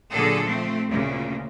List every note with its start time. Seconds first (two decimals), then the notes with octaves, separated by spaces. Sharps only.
0.13 A#2 D3 F#3 G#4 A4
0.42 F3 A3 C4
0.88 D2 A#2 C#3 A#3